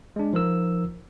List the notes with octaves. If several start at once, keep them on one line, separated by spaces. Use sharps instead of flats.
G#3 D4
F3 D#4 A#4 E6